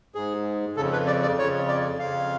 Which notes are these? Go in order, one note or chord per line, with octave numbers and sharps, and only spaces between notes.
G#2 G#4
F2 C#3 A4
B4
D5
D5
F2 C#3 C#5
D5
F2 C#3 F5